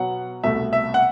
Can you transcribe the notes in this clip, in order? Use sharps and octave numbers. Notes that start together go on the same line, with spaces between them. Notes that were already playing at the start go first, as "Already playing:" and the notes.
Already playing: B2 F#3 B3 F#5
C2 B2 A3 E5
E5
F#5